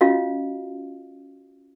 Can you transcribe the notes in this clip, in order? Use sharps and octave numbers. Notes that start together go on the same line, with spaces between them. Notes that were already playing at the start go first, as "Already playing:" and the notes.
C#4 F4 F#4 D#5 F5